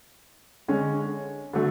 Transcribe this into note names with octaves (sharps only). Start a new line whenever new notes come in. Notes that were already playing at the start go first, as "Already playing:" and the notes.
D3 G#3 C#4
D3 F#3 A3